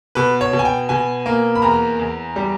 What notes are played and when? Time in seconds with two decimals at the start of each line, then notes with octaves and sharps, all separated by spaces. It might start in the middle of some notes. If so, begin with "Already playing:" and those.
0.15 B2 B4
0.41 C#5
0.53 B2
0.59 G#5
0.65 G5
0.89 B2 G#5
1.26 A#3
1.55 B5
1.62 E2 A#5
1.99 E2
2.36 G3